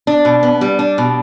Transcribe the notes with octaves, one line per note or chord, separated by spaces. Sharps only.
D4
B2
B3
G3
D4
B2